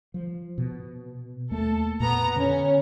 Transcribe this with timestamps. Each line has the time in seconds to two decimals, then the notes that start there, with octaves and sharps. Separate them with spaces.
0.14 F3
0.58 B2
1.51 D#2 A3 A#3 A4
2.00 F2 A#2 B3 A#5
2.36 D3 C#4